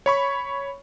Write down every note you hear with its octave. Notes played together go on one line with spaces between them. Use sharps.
C#5 B5 C#6